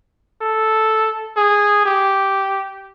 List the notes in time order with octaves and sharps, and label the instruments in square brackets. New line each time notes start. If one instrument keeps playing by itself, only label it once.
[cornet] A4
G#4
G4